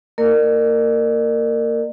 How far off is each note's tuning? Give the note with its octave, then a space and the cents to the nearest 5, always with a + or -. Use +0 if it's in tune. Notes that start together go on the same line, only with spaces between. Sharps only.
A#3 -25 A#4 -20 D5 +45